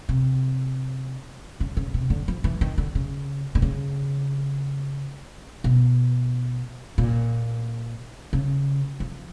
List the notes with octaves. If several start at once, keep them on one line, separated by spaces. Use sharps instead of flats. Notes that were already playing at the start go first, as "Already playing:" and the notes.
C3
C#3
C#3
C3
D3
F3
E3
D#3
D3
C#3
D3
C#3
B2
A#2
C#3
F3